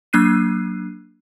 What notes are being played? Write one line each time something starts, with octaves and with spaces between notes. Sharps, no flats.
F#3 A#3 D4 F#6 C7 D#7